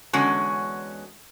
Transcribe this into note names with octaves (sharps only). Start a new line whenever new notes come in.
E2 D3 G#3 C#4 F#4